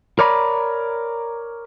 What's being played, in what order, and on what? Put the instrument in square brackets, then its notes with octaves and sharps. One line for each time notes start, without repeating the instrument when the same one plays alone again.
[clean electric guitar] A#4 C#5 D5 A#5 B5